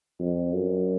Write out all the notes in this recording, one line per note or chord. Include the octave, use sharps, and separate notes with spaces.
F2
F#2